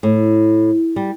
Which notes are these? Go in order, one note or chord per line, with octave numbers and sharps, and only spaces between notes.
A2
G3